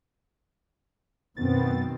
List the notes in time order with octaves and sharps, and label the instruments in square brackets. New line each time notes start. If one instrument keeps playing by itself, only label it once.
[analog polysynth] F#2 B3 A6 [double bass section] B2 D#3 C4